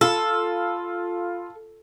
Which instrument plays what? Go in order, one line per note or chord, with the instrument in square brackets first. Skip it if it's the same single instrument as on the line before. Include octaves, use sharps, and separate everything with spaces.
[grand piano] F4 B5 [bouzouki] A4